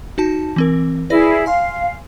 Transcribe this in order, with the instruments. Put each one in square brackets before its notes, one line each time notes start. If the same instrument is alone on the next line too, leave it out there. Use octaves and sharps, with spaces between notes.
[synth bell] D#4 F#4 A5
E3 C4 A#4
[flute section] E4 G#4 [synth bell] B4 D5 A#6
[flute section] F5 [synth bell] G#5 C6